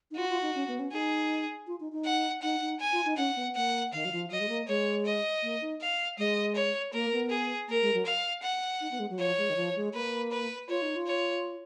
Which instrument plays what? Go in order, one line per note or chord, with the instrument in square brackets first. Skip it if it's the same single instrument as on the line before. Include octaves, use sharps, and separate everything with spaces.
[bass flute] D#4
[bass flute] F4 [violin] F#4
[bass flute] F4
D#4
C#4
B3
C#4
[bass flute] D#4 [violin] G#4
[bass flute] F4
D#4
D#4
[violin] F#5
[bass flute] D#4 [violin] F#5
[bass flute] D#4
[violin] G#5
[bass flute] F4
D#4
[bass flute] C#4 [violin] F#5
[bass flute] B3
[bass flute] A#3 [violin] F#5
[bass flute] D#3 [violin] F5
[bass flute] F#3
F3
[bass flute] F#3 [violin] D#5
[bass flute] G#3
A#3
[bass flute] G#3 [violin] C#5
[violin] D#5
[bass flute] A#3
D#4
[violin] F5
[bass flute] G#3 [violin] D#5
[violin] C#5
[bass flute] A#3 [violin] A#4
[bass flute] B3
[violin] G#4
[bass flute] A#3 [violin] A#4
[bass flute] G#3
F#3
[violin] F5
F#5
[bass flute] D#4
B3
G#3
F#3
[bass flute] F3 [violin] C#5
[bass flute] G#3
D#3
F3
G#3
[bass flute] A#3 [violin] B4
[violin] B4
[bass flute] F4 [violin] C#5
[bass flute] D#4
F4
[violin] C#5